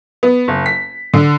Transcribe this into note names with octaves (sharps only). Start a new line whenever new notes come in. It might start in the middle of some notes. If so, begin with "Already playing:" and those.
B3
F#1
B6
D3